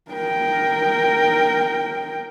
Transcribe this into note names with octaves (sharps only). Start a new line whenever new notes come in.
A#4 G5